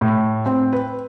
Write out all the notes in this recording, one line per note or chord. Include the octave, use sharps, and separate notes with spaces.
A2
C4
B4